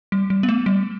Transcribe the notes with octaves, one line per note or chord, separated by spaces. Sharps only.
G3
G3
B3
A3
G3